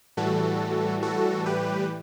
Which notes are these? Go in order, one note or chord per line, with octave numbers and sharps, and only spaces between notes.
A2 E3 G3 F#4 A4
F#4 A4
G4 B4